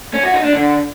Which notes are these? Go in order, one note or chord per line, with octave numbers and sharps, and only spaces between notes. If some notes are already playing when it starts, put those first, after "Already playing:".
C#4
F#4
D#4
D4
D3